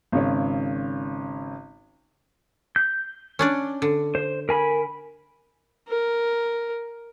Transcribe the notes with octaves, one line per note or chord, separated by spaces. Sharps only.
G#1 C#3 C#5
G6
C#4 D4 D5
D3
C5
A#4 G#5 B5
A#4